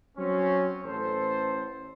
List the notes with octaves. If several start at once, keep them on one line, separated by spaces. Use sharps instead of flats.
F#3 C4 C#4
A1 A4 C5